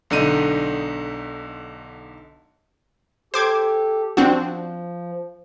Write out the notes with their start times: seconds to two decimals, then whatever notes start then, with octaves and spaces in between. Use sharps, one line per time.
0.10 B1 D3 D#4 D#7
3.34 G4 A4 C5 D6 G#6
4.17 F3 C4 D4 F#4